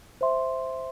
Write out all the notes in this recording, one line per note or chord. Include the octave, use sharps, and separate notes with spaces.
C5 E5 C6